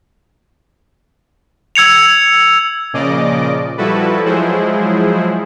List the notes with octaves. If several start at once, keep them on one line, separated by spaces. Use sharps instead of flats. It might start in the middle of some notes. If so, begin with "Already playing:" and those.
E6 G#6 C#7 F7
A#2 C#3 F3 D5 D#5 D6
F3 G3 E4 F#4 A4 B4
F3 F#3 G#3 E4 G#4 C5